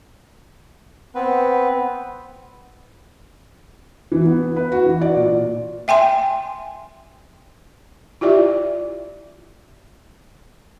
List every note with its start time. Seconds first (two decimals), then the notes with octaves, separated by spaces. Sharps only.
1.15 B3 C4 B4 F#5
4.12 E3
4.26 B3
4.56 B4
4.72 F#4
4.86 E3
5.01 D5
5.16 A#2
5.88 E5 G5 G#5 C6
8.21 E4 F4 G4 D5 E5